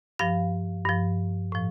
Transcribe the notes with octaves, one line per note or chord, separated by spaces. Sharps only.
G2 F3 F5
G2 F3
A2 F3